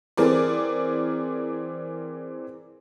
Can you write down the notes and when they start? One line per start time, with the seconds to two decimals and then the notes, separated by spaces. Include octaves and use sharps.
0.17 E3 C4 G#4 A#4 D5